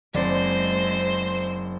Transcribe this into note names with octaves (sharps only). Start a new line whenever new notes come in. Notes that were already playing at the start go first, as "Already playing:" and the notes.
F#1 G#3 C4 C5 D5